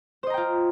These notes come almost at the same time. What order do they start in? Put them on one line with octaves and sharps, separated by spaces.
C5 D#5 A#5 G5 F4